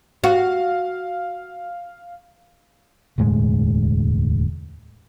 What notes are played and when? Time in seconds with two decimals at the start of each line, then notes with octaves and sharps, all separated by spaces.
0.24 F#4 F5
3.18 E1 D2 A2 G#3